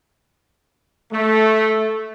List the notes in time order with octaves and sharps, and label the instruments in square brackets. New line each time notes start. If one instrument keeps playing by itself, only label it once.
[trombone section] A3